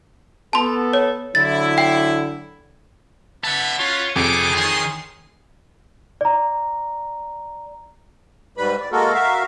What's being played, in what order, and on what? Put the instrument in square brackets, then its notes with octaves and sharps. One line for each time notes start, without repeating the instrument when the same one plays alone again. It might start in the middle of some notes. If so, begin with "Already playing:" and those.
[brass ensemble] B3 A4 [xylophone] A5 C6
[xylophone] C#5
[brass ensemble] D3 F#3 E4 [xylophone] A6
[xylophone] G5
[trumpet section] B3 E5 B5 [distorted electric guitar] F#5 A5
[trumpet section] C#4 F#5 B5 [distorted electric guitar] F4 [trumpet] C#5
[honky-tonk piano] F2 [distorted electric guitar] C3 A4 [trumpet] G#4 [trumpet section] D6
[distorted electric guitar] D#3 [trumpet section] C#5 C6
[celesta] D5 A#5
[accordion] G#2 G3 B4 B5
D5
G#3 A#3 F#4 A4 A#4
F#4 A#4 E5 F5